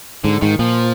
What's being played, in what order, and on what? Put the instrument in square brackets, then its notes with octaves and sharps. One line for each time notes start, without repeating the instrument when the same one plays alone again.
[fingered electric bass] G#2 [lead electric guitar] D3
[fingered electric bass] G#2 [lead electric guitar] D#3
[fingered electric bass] A#2 [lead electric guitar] F3